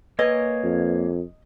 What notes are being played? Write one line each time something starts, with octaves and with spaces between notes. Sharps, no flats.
A#3 B4 C#5 D#5 G#5
F2